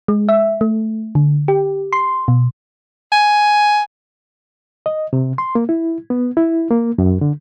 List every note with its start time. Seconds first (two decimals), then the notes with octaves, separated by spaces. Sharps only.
0.08 G#3
0.29 E5
0.61 A3
1.15 D3
1.48 G4
1.93 C6
2.28 B2
3.12 G#5
4.86 D#5
5.13 C3
5.38 C6
5.55 A#3
5.69 E4
6.10 B3
6.37 E4
6.71 A#3
6.98 F#2
7.21 D3